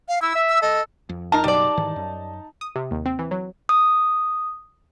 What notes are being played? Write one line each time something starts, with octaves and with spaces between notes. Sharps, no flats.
F5
E4 E6
E5
E6
A4 D#5
F2
D#4 A#4 A5
F#1 B2 F#3 G3 D5
G#2 D#3 E3
F#2
D#6
C3
D#2
C4
E3
F#3
D#6